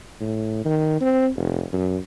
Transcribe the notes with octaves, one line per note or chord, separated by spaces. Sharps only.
A2
D#3
C4
F1
F#2